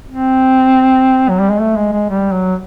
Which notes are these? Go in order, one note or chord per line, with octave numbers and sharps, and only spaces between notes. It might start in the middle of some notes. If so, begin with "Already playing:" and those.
C4
F#3
G3
G#3
A3
G#3
G#3
G3
F#3